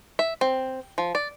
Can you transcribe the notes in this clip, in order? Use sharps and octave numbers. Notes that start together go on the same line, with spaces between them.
E5
C4
F3
D5